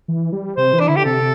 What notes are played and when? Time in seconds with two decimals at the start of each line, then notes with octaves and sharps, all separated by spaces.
0.08 E3
0.32 G3
0.56 C3 C5
0.73 E3
0.80 D4
0.88 D3 E4
0.96 G4
1.05 C3 A4